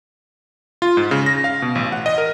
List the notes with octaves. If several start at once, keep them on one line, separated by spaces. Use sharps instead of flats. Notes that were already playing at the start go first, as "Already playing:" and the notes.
F4
G#2
C#3
A#6
F5
B2
A1
F#5
D#5
A#4